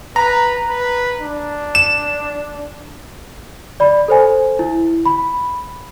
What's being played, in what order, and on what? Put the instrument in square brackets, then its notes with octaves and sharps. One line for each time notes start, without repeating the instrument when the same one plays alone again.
[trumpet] B4 [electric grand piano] A#5
[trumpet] B4
D4
[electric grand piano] E7
[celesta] D5 B5
A4 C5 G#5
E4
B5